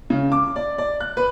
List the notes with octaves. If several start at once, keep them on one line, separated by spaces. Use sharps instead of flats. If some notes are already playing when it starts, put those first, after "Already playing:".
C#3
D6
D5
D5
F#6
B4